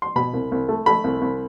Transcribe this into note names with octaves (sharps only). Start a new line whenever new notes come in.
C6
B2 B5
C2
C2
A3
A3 B5
C2
C2